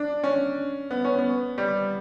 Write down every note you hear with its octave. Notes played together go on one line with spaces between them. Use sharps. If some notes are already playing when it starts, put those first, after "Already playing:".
Already playing: D4
C#4
B3
C#4
B3
G3